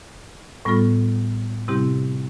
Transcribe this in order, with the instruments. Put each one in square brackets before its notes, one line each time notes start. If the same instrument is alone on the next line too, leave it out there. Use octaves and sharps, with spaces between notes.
[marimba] A2 G3 B3 F4 A4
C3 G3 C4 E4 G4